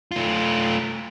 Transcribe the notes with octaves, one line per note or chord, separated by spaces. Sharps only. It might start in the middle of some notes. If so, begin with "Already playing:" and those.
A3 F4